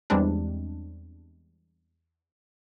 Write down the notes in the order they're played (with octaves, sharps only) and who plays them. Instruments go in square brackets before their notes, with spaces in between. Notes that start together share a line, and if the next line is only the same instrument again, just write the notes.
[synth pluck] E2 G3 G#3 C4 D4